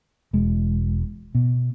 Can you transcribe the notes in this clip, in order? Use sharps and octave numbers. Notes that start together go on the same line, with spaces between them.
E1 G#3
B2